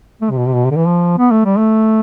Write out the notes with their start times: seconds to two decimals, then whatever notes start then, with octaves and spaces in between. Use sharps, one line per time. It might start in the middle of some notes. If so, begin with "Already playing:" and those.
0.22 A3
0.31 C3
0.37 B2
0.47 C3
0.54 B2
0.65 C3
0.71 D3
0.76 E3
0.86 F3
1.18 B3
1.31 A3
1.45 G3
1.58 A3